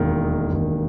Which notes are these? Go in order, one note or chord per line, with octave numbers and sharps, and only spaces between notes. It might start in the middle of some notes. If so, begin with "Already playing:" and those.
Already playing: E1 D#2 D#3
E1 D#2 D#3